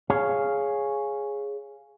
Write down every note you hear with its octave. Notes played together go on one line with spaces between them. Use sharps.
G#4 C#5 F5